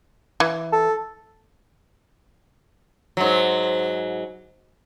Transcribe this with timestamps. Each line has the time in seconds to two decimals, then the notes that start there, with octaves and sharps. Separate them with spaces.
0.40 E3
0.73 A4
3.17 G#2 F#3